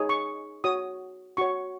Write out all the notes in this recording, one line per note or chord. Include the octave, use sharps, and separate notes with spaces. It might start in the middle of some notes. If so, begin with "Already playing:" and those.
Already playing: D#4 G#4 C#5
C#6
F#4 C#5 D#6
F#4 C#5 C#6